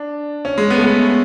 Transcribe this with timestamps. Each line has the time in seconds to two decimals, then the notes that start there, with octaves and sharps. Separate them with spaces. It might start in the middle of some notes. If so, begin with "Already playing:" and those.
Already playing: D4
0.45 C#4
0.58 G#3
0.70 B3
0.78 A3
0.84 B3